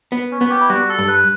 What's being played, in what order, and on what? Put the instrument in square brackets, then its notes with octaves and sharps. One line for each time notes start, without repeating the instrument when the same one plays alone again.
[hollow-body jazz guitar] B3
[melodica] C#4
[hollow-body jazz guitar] B3
[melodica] G4
E4
[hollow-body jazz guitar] G3 [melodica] F#4
[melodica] A4
[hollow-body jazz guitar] G2
[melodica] B4